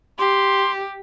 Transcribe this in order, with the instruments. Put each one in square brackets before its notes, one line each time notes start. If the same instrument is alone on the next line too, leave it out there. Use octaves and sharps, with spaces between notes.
[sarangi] G4 [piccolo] C6